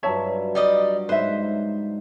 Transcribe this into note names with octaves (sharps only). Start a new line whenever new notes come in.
G2 F#3 F4 C#5 E5 A5
G3 D5 D#5
G#2 B4 C5 E5